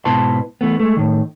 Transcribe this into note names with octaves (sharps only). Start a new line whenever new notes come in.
G#2 B2 E4 B4 A5 C6
E3 A3 B3
G#3 A3
A2 D#3